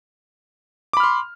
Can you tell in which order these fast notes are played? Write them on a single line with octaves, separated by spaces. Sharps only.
D6 B5 F6 C6